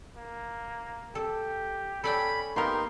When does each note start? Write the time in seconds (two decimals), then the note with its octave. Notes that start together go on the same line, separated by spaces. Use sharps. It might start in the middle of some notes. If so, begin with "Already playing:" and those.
0.17 A#3
1.15 G4 A4
2.04 C#4 A4 D5 G5 B5
2.56 A#3 B3 D#4 G4 A#4 C6